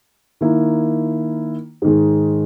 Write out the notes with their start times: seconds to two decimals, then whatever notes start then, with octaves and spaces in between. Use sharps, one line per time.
0.41 D#3 A#3 E4
1.82 G#2 D#3 G#3